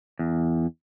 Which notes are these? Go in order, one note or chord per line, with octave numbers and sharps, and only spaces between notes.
E2